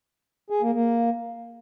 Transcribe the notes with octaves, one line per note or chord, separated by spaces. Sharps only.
G#4
A#3
A#3